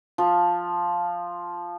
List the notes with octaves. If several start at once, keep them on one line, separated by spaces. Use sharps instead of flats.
F3